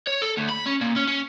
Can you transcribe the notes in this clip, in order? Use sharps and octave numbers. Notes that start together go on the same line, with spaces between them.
C#5
A4
D2
B5
C#4
A#2
C#4
C#4